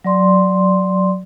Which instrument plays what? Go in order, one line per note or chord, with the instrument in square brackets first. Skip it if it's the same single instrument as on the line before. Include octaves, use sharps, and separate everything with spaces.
[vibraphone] F#3 D5 C6